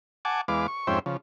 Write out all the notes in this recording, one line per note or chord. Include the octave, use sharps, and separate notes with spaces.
F#5 G#5 A5 D6
E2 G#3 B4 F5 D6
C#6
F2 G#2 C#4 C5 E5 G5
C#3 F3